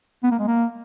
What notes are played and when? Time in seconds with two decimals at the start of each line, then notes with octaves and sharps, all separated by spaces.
0.23 B3
0.31 A#3
0.39 G#3
0.47 A#3